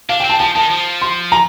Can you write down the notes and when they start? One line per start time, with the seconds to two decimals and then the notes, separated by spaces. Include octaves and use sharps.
0.09 D4 F5
0.20 G5
0.24 C4
0.29 A5
0.40 F3 A5
0.55 D#3 A5
0.70 F3
1.02 C6
1.32 A#5